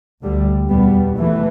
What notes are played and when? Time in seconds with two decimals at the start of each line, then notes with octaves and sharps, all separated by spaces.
0.23 D2 D3 G3
0.69 E2 B2 G3 B3
1.16 E2 E3 A3